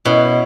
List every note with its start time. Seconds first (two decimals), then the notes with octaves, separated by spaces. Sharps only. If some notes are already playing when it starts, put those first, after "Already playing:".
0.05 B2 C#4 E4